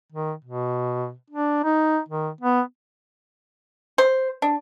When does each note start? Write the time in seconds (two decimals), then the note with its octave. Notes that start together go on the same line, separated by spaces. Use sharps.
0.12 D#3
0.44 B2
1.30 D4
1.64 D#4
2.09 D#3
2.41 B3
3.98 C5
4.42 D4